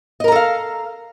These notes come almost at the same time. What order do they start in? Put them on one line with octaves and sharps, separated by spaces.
D#5 A#4 A#5 A4 F5